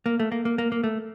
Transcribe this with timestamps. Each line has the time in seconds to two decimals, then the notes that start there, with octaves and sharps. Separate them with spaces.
0.06 A#3
0.20 A3
0.32 A#3
0.45 A#3
0.58 A#3
0.72 A#3
0.84 A3